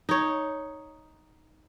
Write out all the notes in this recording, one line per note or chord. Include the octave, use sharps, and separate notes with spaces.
D#4 C#5